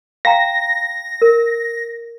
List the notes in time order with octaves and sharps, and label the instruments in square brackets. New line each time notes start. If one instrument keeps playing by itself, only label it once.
[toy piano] F5 G5 A#5 [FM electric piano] A#6
[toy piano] A#4